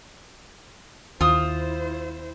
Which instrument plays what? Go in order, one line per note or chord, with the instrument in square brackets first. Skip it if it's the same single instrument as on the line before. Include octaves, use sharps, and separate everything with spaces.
[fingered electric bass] D#2 [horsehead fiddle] E4 C5 [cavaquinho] F4 D#6